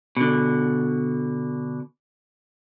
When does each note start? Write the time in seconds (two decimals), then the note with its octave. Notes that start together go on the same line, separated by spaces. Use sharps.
0.17 B2 D3